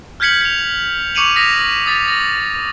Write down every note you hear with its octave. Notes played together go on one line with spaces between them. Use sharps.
F6 G6 G#6 B6 C#7 F#7
B6 F7
C#6 D6 C#7 D#7 F7 F#7
D#6 A#6 B6 F7
D#6 A6 B6
A#6